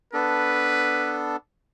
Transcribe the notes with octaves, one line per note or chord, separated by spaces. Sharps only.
B3 D4 A4 B4